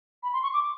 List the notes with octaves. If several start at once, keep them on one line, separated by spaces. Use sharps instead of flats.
B5
C6
C#6
D6